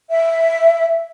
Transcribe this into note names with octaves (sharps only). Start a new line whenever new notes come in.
E5